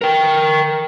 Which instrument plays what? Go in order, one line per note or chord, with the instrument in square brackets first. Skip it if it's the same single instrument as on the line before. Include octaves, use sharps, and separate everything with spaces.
[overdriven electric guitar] A#4 G5